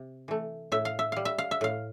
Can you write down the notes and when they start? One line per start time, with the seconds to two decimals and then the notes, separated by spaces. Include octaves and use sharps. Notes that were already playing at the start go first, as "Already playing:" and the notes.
Already playing: C3
0.28 E3 A3
0.72 A2 E5
0.85 F5
0.99 E5
1.12 G3 F5
1.25 E5
1.38 F5
1.51 E5
1.61 A2 F5